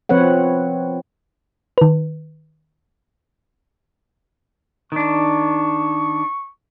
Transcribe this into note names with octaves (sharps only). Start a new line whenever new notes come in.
F3 C4 B4 C#5 F#5
D#3 B4
D#3 D4 C#6